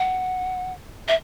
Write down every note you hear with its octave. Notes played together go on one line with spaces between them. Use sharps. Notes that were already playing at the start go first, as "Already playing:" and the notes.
Already playing: F#5
E5